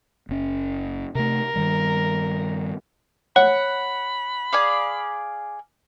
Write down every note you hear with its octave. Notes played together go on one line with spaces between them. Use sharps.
F#1 C#4
C3 A3 A#4
G2 D#3 G3
C#5 F#5 B5
G#4 D5 F5